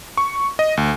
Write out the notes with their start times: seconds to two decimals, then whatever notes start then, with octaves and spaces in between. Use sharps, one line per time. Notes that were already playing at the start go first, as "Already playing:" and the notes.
0.17 C#6
0.59 D#5
0.77 D2